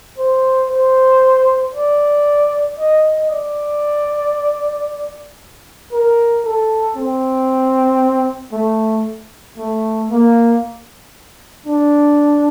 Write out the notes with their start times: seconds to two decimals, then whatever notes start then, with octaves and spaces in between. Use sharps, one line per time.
0.18 C5
0.70 C5
1.74 D5
2.79 D#5
3.31 D5
5.92 A#4
6.45 A4
6.96 C4
8.53 A3
9.58 A3
10.10 A#3
11.66 D4